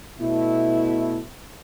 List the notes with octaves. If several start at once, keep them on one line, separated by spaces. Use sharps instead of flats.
B2 A3 E4